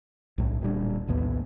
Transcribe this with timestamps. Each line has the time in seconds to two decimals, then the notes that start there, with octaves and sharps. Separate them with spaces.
0.38 B1 A2
0.61 D1 A#2 G3 D4
1.07 A#1 D#2 A2 B3